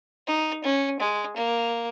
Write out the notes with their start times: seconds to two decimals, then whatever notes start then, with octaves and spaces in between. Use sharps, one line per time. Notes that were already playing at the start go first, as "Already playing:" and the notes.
0.27 D#4
0.64 C#4
1.00 G#3
1.36 A#3